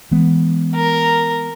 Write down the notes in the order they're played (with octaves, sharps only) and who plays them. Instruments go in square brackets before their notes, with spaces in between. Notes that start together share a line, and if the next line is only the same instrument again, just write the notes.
[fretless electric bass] E3 G#3 B3
[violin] A#4